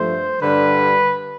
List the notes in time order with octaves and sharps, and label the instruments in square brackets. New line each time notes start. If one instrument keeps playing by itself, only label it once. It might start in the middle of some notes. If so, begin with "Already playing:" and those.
Already playing: [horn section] G2 F3 A3 C5
G2 D3 G3 B4